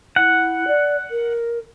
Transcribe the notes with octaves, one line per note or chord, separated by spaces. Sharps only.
E4 F#5
D5
A#4